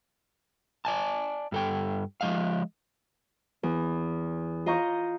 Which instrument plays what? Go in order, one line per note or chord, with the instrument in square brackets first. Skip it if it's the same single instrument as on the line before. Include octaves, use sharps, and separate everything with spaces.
[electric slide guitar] D5 G#5 A5
G2 A4 G5
F3 G3 G#3 D#5 F5
[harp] E2
F4 D#5 A#5 C#6 G6